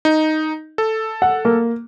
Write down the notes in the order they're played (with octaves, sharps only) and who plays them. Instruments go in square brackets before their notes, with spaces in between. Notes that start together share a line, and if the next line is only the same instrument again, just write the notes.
[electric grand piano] D#4
A4
[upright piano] F#5
A#3